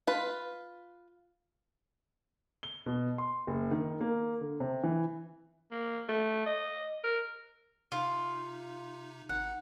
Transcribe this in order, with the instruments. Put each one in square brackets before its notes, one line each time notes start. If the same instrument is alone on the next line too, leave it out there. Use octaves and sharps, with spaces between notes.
[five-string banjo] F4 B4
[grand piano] G7
B2
C6
F#1
D#3
A#3
D3
C3
E3
[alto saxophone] A#3
A3
D#5
A#4
[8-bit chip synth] C3 D#4 [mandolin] F4
[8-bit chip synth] G#1 D#4 [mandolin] F#5